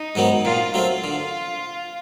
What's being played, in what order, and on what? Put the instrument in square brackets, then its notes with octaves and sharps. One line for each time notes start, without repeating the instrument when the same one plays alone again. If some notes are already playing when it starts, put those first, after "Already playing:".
Already playing: [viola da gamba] D#4
[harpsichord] G#2 D#3 F#3 B3
[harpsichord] A#2 [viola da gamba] F4
[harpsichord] F#3 A3 C4 [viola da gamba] F4
[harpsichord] D3